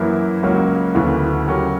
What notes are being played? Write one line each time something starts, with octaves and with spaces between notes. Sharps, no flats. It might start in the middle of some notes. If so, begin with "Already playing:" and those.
Already playing: F#2 E3 A#3 E4
C#2 C#3 F#3 A#3 C#4
D2 C#3 E3 B3
C#3 F#3 C#4 G4 A#4